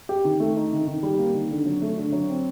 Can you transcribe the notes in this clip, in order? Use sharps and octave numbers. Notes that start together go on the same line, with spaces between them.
G4
D#3
A3
D#4
D#3
D#3
G3
A#3
D#3
D3
F#3
A3
D3
F#3
C4